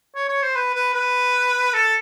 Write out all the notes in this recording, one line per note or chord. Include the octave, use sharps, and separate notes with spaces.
C#5
C#5
C5
B4
B4
B4
A4